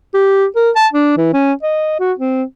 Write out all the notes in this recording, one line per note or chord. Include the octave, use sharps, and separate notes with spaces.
G4
A#4
A5
D4
E3
C#4
D#5
F#4
C4